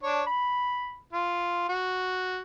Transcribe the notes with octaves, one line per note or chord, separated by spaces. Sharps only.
D4 C#5
B5
F4
F#4